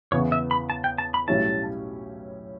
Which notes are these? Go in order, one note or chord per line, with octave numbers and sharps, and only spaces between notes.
E2 C#3 E3 B3 C#5
E5
B5
A5
G5
A5
B5
B1 A2 G3 C#4 E4 A5